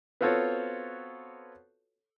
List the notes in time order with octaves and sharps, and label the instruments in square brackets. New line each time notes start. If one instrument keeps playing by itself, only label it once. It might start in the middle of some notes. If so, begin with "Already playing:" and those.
[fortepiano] B3 C4 F4 F#4 A4 C#5